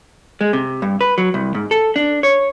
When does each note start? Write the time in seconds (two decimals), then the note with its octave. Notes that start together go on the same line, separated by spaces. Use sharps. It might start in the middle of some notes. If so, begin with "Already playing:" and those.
0.41 G#3
0.53 C3
0.82 G2
1.01 B4
1.18 F#3
1.34 C2
1.55 G#2
1.71 A4
1.96 D4
2.23 C#5